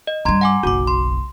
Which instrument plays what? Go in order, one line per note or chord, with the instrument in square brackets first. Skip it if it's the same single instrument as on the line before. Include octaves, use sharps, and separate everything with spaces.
[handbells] D#5
[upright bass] G2 G3 [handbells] A#5 C6 G#6
[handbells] F#5 G#5 D6
[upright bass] F#1 B1 [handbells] F#4 D6
[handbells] C6